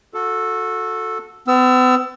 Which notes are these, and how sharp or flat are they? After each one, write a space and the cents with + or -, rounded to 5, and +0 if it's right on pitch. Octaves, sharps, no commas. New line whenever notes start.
F#4 -30 A4 +0
B3 +45 E6 +15